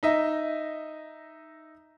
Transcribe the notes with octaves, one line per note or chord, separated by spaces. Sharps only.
D#4 D#5 E5